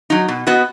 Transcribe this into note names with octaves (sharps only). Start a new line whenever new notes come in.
F#3 D#4
B2
B3 F#4 B4 D#5